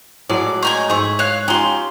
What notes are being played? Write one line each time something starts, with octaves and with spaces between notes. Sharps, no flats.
A2 F#3 G#3 D5
C#4 D#4 G#5
G#2 G#4 E5 C#6
C#5 F5 F#6
C#4 D#4 F4 G4 C6